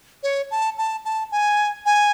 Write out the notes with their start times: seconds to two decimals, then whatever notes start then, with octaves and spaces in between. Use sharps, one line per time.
0.23 C#5
0.51 A5
0.78 A5
1.05 A5
1.32 G#5
1.86 G#5